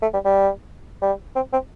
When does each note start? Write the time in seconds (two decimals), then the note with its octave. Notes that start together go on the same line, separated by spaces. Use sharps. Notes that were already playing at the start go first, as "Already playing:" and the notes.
0.02 A3
0.13 G3
0.25 G3
1.02 G3
1.36 C4
1.53 C4